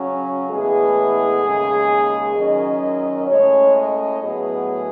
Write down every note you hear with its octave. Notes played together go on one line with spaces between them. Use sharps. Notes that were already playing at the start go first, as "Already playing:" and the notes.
Already playing: C#3 F#3 C#4
A2 E3 G#3 B3 G#4
D#2 C#3 G#3
F#2 D#3 F#3 C#4 D#5
A2 G#3 C#4 C#5
D#5
A2 F#3 B3 G#4